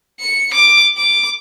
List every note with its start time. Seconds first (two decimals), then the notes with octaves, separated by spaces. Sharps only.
0.20 C#7
0.54 D6
0.97 D6